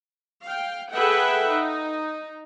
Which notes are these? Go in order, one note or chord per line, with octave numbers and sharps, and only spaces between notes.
F5 G5
G#4 A4 B4 E5 F#5 G5
D#4